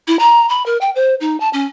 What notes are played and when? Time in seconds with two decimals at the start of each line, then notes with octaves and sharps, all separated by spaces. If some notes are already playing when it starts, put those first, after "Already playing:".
0.07 E4
0.19 A#5
0.50 B5
0.66 A#4
0.81 G5
0.96 C5
1.20 D#4
1.40 A5
1.53 C#4